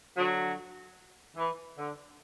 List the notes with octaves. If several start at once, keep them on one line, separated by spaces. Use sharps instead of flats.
D3 F#3
E3
D3